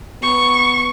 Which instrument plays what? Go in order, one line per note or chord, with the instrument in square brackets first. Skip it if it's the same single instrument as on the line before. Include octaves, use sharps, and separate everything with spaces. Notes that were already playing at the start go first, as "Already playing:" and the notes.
[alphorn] B3 [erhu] C#6